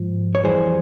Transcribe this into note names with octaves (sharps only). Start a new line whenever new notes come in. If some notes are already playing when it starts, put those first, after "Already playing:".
Already playing: G#2 F3
C#5
F2 E3 G3 G#4 C5